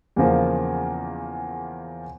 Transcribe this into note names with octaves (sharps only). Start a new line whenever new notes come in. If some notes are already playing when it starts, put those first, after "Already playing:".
E2 C#3 F3 A#3